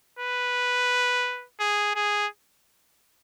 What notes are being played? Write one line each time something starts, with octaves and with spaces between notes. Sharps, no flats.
B4
G#4
G#4